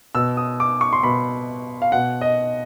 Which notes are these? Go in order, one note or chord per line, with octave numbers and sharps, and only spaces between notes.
B2 E6
D#6
D6
C#6
C6
B2 B5
F5
B2 F#5
D#5